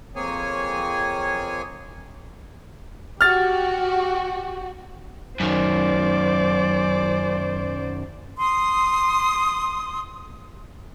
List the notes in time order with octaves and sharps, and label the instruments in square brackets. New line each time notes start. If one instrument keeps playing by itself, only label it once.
[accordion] F2 A#3 C4 G#4 C#5 G#5
[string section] F#4 G4 [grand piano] F6 A6
[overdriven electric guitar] F#2 D#3 [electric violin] C5 D5
[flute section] C6 D#6